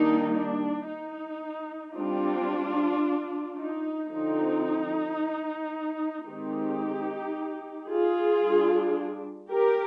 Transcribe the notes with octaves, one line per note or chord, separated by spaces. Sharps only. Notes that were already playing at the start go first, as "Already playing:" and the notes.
Already playing: D#3 G3 A#3 D4 D#4
D4
D#4
G3 C4 D4 F4
D#4
D3 F3 C4 D#4
D#3 G#3 C4 D#4 G4
F4 G#4
G3 D4
G4 A#4